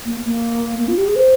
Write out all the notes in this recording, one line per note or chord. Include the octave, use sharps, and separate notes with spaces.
A#3
A#3
A#3
F4
G4
G#4
C5